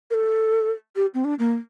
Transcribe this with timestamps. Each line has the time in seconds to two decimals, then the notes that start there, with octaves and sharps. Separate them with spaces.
0.11 A#4
0.14 A4
0.96 G4
1.14 C4
1.24 D4
1.39 A#3